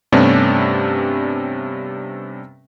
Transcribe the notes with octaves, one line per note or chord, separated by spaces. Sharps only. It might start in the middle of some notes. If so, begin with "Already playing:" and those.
G2 C3 A3 B3 C#4 D4